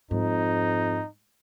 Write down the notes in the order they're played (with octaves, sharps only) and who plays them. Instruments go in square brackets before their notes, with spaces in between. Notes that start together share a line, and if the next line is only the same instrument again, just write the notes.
[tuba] F2 [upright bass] G#2 [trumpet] D#4